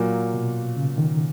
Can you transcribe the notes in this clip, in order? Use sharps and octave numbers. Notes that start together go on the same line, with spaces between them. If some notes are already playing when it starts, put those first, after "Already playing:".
Already playing: A#2 F#3 A#3
B2
C#3
D#3